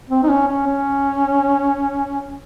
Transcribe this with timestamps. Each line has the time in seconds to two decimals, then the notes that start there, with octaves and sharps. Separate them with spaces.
0.09 C4
0.23 D#4
0.29 C#4
0.48 C#4
0.67 C#4